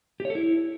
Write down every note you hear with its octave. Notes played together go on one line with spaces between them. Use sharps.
G4
C#5
A4
E4